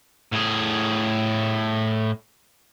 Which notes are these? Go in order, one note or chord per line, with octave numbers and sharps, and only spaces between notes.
A2 G#4